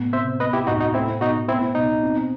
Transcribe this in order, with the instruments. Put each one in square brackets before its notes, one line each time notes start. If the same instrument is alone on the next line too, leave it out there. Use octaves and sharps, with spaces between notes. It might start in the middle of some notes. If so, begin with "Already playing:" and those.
Already playing: [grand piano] A2 B3
[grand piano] C3 [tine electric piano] C5 E5
[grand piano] B3 [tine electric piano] B4 D#5
[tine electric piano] E4 G4
[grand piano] A2 [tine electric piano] D#4 F#4
[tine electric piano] D#4 F#4
[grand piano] A3 [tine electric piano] C4 E4
[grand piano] B2 [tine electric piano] D#4 F#4
[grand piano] B3 [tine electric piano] C4 E4
[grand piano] B2 [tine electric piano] D#4
[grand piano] C4